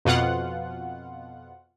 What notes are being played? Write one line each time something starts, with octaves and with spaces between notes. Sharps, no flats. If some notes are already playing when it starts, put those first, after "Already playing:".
F2 B2 F4 F#5